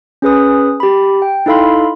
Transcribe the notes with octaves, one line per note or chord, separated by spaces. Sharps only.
C#4 G#4 B4 D#6
G4 B5
G5
D#4 E4 A4 F5 B5 C6